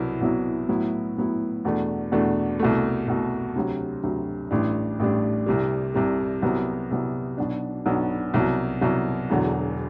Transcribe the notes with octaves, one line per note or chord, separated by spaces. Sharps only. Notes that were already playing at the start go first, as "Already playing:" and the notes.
Already playing: C2 B2 F#3 B3 E4
C2 B2 F#3 B3 E4
A2 F#3 B3 E4
A2 F#3 B3 E4
E2 B2 A3 D4
E2 B2 A3 D4
C2 B2 A3
C2 B2 A3
D2 C3 F#3
D2 C3 F#3
A1 A2 G3 D4
A1 A2 G3 D4
C2 C3 G3
C2 C3 G3
C2 C3 F#3 B3
C2 C3 F#3 B3
B1 B2 F#3 B3 D4
B1 B2 F#3 B3 D4
C2 B2 F#3
C2 B2 F#3
E1 E2 D3 F#3